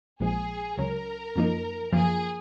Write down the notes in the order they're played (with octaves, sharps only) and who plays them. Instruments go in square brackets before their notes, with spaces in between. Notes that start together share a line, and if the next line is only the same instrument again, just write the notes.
[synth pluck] A#1 A#2 F3 G#3 [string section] G#4
[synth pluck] C#2 C#3 F#3 C#4 [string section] A#4
[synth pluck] F#2 F3 A#3 D#4
[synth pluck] F#2 F3 A#3 F4 [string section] G#4